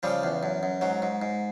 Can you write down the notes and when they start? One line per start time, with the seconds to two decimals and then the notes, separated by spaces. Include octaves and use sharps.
0.03 C#3 F3 G3
0.23 E2
0.43 F#2
0.63 F#2
0.81 G#2 F#3
1.02 G#2
1.22 G#2